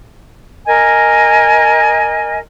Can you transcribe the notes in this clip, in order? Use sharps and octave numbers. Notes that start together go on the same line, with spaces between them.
A#4 D#5 G#5